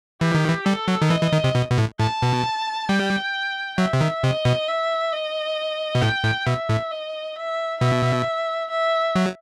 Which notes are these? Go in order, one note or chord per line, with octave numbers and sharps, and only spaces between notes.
E3 G4
D#3
E3
G3 A4
F#3
D#3
E3 D#5
E3
D#3
C3
B2
B2
A2
A2 A5
B2
G3 G5
F#3 E5
C3
D#3
C3 D#5
B2
E5
D#5
B2
A2 G5
A2
B2 E5
A2
D#5
E5
B2 E5
E5
F#3